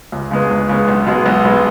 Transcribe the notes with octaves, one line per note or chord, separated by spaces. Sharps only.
C#2
C#3 G#3 B3
C#2
C#3 G#3 B3
B1
B2 G#3 B3
B1
B2 G#3 B3